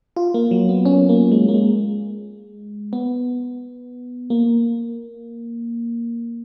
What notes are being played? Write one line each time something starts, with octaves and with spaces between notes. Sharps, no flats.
F4
A#3
F#3
B3
C#4
A#3
G#3
A#3
G#3
B3
A#3